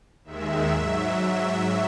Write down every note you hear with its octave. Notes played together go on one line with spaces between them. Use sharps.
D#2 D#3 G#3 E5
G#2 F#3